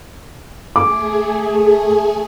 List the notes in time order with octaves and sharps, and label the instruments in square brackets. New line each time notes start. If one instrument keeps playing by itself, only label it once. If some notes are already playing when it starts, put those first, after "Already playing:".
[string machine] A3 G#4 [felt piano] D6